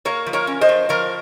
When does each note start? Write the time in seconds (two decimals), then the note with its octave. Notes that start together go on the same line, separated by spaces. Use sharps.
0.05 A#3 A#4 C#5
0.26 F3
0.33 A#4 C#5
0.47 C#4
0.61 C5 D#5
0.69 F3
0.89 F3 A#4 C#5